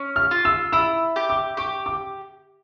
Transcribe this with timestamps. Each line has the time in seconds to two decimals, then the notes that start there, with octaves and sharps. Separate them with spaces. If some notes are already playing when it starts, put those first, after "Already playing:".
Already playing: C#4
0.16 F6
0.31 F4
0.45 E6
0.72 E4 E6
1.16 G4
1.30 D6
1.57 G4 C#6
1.86 D6